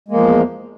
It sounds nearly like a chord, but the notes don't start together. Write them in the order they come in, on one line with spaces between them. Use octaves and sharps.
G#3 A#3 F3 E2